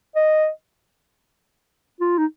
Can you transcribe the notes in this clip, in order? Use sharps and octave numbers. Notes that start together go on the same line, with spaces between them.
D#5
F4
D#4